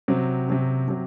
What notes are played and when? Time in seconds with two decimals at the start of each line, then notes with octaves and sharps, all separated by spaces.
0.08 C3 F#3 C4
0.48 C3 F#3 C4
0.88 C3 F#3